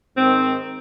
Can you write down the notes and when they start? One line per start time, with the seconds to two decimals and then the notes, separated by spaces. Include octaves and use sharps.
0.15 G#2 D#3 C4